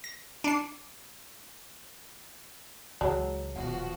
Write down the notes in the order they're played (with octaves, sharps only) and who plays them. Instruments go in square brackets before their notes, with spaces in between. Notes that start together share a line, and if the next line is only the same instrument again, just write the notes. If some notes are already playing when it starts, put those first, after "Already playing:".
[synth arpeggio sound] A#6
D4 C7
[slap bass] C#2 E3 [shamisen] F#3 G#3 [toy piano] C#5 A5 A#5
[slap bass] D#1 [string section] B2 F3 F#4 [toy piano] F#5